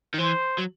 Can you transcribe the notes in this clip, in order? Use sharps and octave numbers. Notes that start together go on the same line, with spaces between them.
D#3
E3 C5
F#3